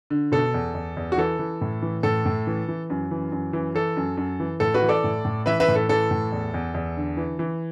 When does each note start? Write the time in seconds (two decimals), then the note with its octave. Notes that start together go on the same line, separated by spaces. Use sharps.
0.10 D3
0.32 B2 A4
0.54 E2
0.74 E2
0.97 E2
1.12 F#4
1.18 E3 A4
1.39 E3
1.61 A2
1.82 E3
2.03 A2 A4
2.26 A2
2.47 E3
2.68 E3
2.90 F#2
3.11 E3
3.32 F#2
3.53 E3
3.75 E3 A4
3.97 F#2
4.17 F#2
4.40 E3
4.60 A2 A4
4.74 F#4 B4
4.82 E3
4.89 A4 D5
5.04 A2
5.25 A2
5.46 E3 B4 E5
5.60 B4 E5
5.68 A2
5.75 A4
5.89 E3 A4
6.11 A2
6.32 E2
6.54 E2
6.74 E2
6.97 D3
7.17 E3
7.39 E3